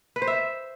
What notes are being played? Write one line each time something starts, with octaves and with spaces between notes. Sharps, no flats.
B4
C5
E5